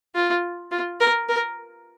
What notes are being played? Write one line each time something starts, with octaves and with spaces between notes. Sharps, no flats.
F4
F4
A#4
A#4